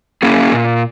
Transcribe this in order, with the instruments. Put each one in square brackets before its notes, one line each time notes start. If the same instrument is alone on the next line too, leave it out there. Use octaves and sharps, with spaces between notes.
[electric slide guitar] A#3 C#4 E4 G#4
A#2